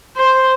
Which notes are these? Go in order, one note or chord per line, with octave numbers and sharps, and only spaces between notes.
C5